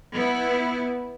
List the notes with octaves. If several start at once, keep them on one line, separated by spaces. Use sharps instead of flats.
B3 E4